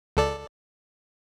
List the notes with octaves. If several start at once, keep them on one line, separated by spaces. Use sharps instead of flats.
C#2 A4 D5